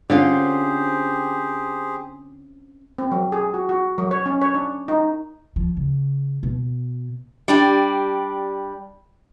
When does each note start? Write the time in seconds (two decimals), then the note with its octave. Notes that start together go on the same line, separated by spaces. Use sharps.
0.10 D3 C4 C#4 F4 G4 G#4 C5
2.98 C4
3.12 F#3
3.32 G#4
3.54 F#4
3.69 F#4
3.98 F#3
4.11 C#5
4.26 C#4
4.42 C#5
4.54 D4
4.88 D#4
5.56 F3
5.77 C#3
6.43 B2
7.48 G3 D4 G4